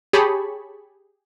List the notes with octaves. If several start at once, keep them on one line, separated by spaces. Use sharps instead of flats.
G4 G#4 C#5 A5 B5 C#6